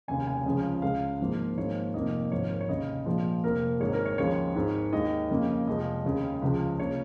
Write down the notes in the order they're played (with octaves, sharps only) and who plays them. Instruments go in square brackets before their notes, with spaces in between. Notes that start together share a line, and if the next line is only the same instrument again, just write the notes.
[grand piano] F1 D#2 C#3 G#5
G#5
C#2 C#3 F3 G#3
C#2 C#3 G#3 F5
G#1 G#2 F3 A#3
G#1 G#2 F3 A#3 C#5
F1 F2 D#3 A#3 D#5
G#1 G#2 F3 C#5
A#4
C#5
F1 D#2 C#3 D#5
A#1 A#2 F3 G#3
F1 F2 F3 A#3 A#4
G#1 G#2 G#3 C#5
A#4
C#5
D#2 C#3 F3 G#3 C#5
G#1 G#2 D#3 G#3
D#2 D#3 G#3 D#5
F2 C#3 A#3
F1 F2 F3 G#3 D#5
D#2 C#3 G#3
C#2 C#3 F3 G#3
C#3 A#3 C#5